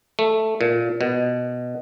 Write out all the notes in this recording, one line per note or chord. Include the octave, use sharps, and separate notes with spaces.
A3
A#2
B2